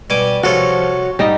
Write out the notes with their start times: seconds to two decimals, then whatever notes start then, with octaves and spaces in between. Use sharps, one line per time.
0.10 B2 G3 G#5 D6
0.44 C2 F3 F4 F#4 A4 C#5
1.19 G#2 G3 D#4